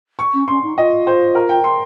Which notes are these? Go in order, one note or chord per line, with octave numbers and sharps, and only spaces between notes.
C#6
C#4
C#4 C6
D#4
F4 D#5
C5
A#4
G5
C6